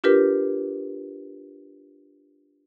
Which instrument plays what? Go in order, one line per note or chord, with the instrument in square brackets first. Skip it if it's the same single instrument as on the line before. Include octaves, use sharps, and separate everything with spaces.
[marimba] D4 F4 G4 A#4 B4